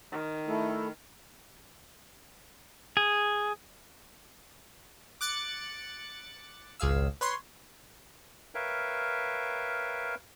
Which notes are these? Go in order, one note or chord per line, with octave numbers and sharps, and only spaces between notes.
D#3
A3 E4 A4
G#4
D6 F#6 A6 C#7
G#1 C#2 G#4 F5 E6
B4 C#5 C6
A#4 B4 C#5 E5 F5 G5